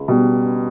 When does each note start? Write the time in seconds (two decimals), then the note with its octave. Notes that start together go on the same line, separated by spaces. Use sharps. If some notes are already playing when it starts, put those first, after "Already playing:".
Already playing: C#2
0.08 B2 G3